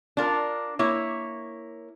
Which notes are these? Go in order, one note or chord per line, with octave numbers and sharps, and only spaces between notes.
D4 F4 A#4
A#3 E4 C#5